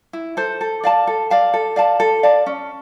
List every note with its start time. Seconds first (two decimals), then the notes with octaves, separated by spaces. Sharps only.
0.13 E4
0.37 A4 C5
0.61 A4
0.84 D5 F5 A5
1.07 A4
1.30 D5 F5 A5
1.54 A4
1.76 D5 F5 A5
2.00 A4
2.23 D5 F5 A5
2.46 C#4